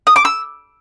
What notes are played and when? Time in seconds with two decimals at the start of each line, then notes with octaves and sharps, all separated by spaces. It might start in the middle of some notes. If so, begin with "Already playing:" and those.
0.07 D#6
0.16 D6
0.25 E6